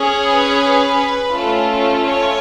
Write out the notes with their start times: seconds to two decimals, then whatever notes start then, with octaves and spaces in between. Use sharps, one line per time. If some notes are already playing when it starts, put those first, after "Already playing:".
Already playing: C#4 G#4
0.26 B4
1.35 A3 C#4 F4
2.08 C#5